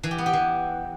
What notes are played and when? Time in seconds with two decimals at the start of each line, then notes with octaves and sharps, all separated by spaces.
0.03 E3
0.11 G4
0.18 B3
0.26 G4
0.33 E3